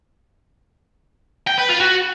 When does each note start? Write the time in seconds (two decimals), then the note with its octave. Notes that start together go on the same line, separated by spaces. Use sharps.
1.47 G5
1.58 B4
1.69 F4
1.80 F#4